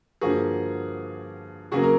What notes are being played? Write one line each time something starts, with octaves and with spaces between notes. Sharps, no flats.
G2 D3 F3 A#3 F#4 G#4
C#3 F#3 A#3 F#4 G#4
A#4